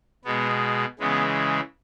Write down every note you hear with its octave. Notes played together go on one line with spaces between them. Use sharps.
B2 G#3 B3
C#3 E3 G#3 B3